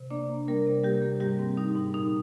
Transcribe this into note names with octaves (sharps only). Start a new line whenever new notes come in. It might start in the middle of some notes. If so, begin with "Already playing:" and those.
Already playing: C3
A#3 D4 D5
A#3
G3 A#3 A#4
C3
C3 G3 G4
A#3
G#2 G3 G4
C4
G3 D#4
G#2
A#2 D#4